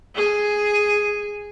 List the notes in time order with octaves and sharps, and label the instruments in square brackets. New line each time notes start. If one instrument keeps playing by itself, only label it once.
[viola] G#4